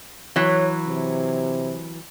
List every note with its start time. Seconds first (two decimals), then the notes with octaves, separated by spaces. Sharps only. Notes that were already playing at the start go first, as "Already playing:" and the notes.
0.36 E3 F#3 C#5
0.88 C3